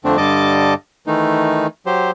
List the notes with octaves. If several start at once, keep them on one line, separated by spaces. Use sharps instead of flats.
F2 D3 A3 C4 D4
G2 D3 G3 D#5 A5 D6
D#3 E3 A3 D#4
F#3 G4 C5